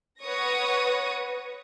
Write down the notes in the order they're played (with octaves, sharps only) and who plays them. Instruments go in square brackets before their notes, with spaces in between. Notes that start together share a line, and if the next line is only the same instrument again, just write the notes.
[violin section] B4 C#5 F#5 C#6 D#6 A#6